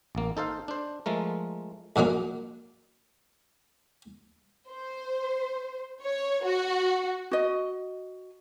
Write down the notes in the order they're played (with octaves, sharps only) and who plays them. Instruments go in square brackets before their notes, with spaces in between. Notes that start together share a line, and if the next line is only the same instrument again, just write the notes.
[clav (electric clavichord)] A1 A#3
D#4 A4 C5 F5
D4 C5
F3 G#3 A3 A#4
[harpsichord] A#1 A#2 F#3 G#3 A#3
[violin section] C5
C#5
F#4
[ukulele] F#4 D#5